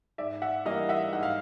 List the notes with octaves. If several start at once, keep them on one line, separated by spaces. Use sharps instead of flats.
G#2 D5 E5
E5 F#5
E3 G3 A#3 D4 D#5 F5
E5 F#5
G#2 F#5
F5